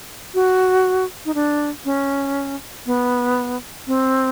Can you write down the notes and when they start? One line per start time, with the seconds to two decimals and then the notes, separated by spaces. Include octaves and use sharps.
0.34 F#4
1.25 D#4
1.35 D4
1.85 C#4
2.86 B3
3.87 C4